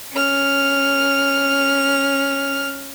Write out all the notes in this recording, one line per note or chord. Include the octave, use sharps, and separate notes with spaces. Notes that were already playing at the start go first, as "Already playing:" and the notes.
C#4 F6